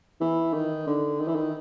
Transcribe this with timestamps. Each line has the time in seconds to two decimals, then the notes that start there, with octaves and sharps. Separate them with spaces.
0.21 E3
0.53 D#3
0.87 D3
1.20 D#3
1.27 E3
1.35 D#3